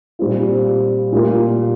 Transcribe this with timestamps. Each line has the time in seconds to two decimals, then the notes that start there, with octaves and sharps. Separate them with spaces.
0.19 A#2 G3 C4 F4
1.12 A#2 G3 A#3 F4